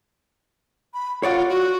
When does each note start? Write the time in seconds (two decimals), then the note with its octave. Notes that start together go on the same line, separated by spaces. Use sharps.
0.94 B5
1.23 F4 C#5 D5 F#5
1.49 F#4